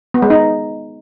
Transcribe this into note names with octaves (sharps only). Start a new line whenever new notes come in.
B3
G#3
D#4